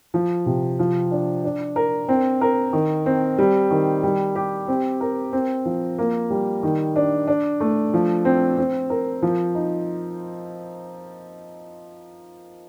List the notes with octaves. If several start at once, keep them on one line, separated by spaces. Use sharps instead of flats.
F3
C3
F3
D4
D4
A#4
C4
A#4
D#3
C4
G3
D#3
G3
G4
C4
A#4
C4
F3
A#3
G3
D#3
D4
D4
A3
F3
C4
C4
A#4
F3
D#4